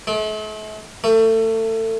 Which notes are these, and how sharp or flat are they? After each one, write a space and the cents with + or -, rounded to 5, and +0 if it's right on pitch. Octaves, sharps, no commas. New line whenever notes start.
A3 -45
A3 +25